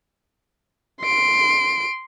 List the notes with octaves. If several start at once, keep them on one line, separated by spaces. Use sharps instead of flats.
C6 D7